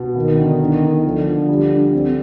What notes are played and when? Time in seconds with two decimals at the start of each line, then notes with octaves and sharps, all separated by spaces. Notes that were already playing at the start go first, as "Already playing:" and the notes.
Already playing: B2
0.16 D#3 B3
0.37 D3
0.60 D4
0.82 D4
1.04 D3 F3
1.26 F3
1.49 G3
1.71 D4
1.93 C4